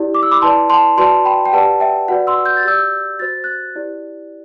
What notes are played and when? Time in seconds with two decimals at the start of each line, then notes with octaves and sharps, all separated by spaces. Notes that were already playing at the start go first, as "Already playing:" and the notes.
Already playing: E4 G4 D5
0.15 D6
0.23 E6
0.31 B5 D6
0.42 E4 B4 D5 A5 C6
0.70 A5 C6
0.98 F#4 B4 D5 A5 C6
1.25 G5 B5
1.46 G5
1.53 G4 B4 D5 F#5 A5
1.80 E5 G5
2.08 F#4 B4 D5 F#5
2.27 C6 E6
2.46 G6
2.57 A6
2.64 G4 D5 E6 G6
3.19 F#4 C5 A6
3.44 F#6 A6
3.75 E4 G4 D5